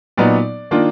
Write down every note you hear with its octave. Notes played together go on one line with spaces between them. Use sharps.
A#2 F#3 B3 D#4 D5
D#3 A#3 D4 F4